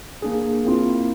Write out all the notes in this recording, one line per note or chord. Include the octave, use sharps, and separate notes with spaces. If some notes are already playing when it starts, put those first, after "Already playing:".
A#3 D4 G#4
A#3 C4 E4 F4